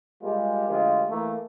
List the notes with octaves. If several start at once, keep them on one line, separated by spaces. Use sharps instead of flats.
G3 G#3 A#3 F4 G4
D2 F3 G#3 F4 G4
E3 A3 A#3